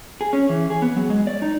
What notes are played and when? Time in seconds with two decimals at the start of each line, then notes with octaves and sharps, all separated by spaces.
0.21 G#4
0.33 C#4
0.49 E3
0.70 G#4
0.82 B3
0.96 F#3
1.10 G#3
1.27 D5
1.42 D#4